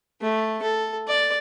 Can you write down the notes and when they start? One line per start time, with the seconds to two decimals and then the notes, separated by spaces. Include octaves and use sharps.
0.21 A3
0.62 A4
1.08 D5